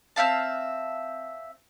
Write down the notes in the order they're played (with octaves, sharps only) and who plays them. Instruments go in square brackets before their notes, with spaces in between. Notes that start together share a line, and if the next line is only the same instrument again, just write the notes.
[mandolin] C4 E5 F5 A5